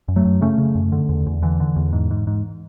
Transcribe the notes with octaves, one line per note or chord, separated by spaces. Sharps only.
F#2
F#3 A3
F#2
C#3 A3 C#4
C#3
F#2
D3
E2
E2
D3 E3
D3
E2
G#2
G#2
G#2